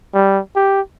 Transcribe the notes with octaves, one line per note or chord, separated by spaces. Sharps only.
G3
G4